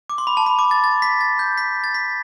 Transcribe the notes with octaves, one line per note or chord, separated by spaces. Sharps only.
D6
C6
B5
A5
B5
D6
A6
A6
B6
A6
G6
B6
A6
B6